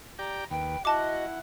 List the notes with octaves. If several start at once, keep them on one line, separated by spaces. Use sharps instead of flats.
G4 D5 G5 A#5
D#2 B4 G5
E4 F#4 D#5 F#5 A5 D6